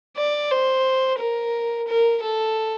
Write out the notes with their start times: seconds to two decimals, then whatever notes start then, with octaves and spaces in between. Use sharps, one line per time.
0.17 D5
0.50 C5
1.19 A#4
1.87 A#4
2.23 A4